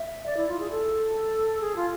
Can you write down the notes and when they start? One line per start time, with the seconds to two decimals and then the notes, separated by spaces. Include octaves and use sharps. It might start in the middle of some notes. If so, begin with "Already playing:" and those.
Already playing: E5
0.26 D5
0.37 E4
0.49 F4
0.60 G#4
0.70 A4
1.61 G#4
1.76 F4